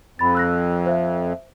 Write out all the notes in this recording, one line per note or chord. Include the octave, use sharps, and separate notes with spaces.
F2 B5 A6
E6 F#6 A#6
C5 E5